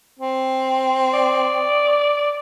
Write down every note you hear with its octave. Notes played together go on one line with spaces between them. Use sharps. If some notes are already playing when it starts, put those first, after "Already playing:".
C4
D5